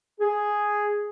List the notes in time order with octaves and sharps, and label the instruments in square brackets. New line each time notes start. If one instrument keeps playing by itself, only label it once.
[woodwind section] G#4